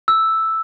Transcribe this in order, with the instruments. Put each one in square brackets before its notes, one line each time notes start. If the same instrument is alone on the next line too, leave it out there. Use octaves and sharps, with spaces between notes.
[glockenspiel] E6